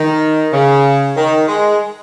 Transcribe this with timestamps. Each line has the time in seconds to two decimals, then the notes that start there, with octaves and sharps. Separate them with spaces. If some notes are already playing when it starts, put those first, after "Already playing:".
Already playing: D#3
0.53 C#3
1.17 D#3
1.48 G#3